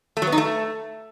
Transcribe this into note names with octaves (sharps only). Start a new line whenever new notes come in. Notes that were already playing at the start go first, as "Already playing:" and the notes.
A3
F#3
B3
D#4
A3